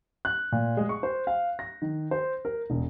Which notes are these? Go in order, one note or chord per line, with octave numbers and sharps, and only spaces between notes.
F#6
A#2
G#3
C#6
C5
F5
A#6
D#3
C5
A#4
E1